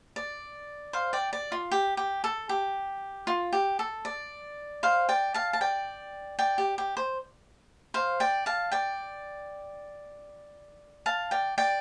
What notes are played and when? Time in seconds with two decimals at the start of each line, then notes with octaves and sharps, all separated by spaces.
0.16 D5
0.93 C5 F5
1.13 D5 G5
1.33 D5
1.52 F4
1.71 G4
1.97 G4
2.24 A4
2.49 G4
3.27 F4
3.53 G4
3.79 A4
4.05 D5
4.83 C5 F5
5.09 D5 G5
5.34 F5 A5
5.53 A5
5.61 D5 G5
6.39 D5 G5
6.58 G4
6.78 G4
6.97 C5
7.94 C5 F5
8.20 D5 G5
8.46 F5 A5
8.71 D5 G5
11.06 F5 A5
11.31 D5 G5
11.58 D5 G5